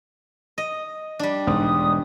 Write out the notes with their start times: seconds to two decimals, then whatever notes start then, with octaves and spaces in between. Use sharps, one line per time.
0.58 D#5
1.19 G3 D4
1.47 E1 G#2 D#6